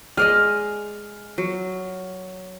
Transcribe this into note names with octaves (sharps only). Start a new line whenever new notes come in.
G#3 D5 D#5 F6
F#3